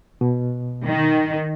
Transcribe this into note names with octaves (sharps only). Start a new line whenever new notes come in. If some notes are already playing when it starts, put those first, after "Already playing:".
B2
D#3